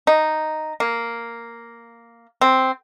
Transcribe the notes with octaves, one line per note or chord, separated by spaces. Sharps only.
D#4
A#3
C4